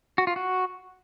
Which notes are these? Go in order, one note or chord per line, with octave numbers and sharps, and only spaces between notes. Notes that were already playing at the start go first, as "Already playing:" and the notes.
F#4
F4
F#4